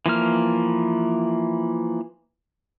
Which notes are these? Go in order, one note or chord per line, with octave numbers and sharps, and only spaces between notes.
E3 F3 A#3 F6